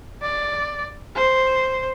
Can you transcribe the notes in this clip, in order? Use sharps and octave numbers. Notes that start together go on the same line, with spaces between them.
D5
C5